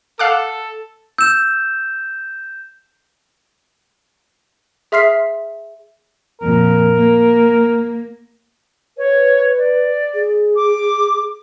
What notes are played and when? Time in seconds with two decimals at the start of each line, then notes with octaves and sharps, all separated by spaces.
0.19 A4 F5 F#5 D6
1.18 E6 G6 E7
4.92 G#4 E5 C6 F6 B6 C7
6.41 F2 A#2 A#4
6.95 A#3
8.97 B4 C#5
9.57 D5
10.14 G#4
10.56 D6